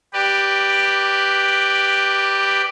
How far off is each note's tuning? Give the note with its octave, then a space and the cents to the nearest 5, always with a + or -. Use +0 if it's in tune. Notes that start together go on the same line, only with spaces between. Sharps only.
G4 +0 B4 +0 D5 +20